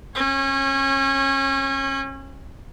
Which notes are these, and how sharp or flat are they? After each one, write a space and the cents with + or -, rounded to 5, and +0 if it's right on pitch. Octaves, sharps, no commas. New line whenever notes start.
C#4 -30 C#5 -15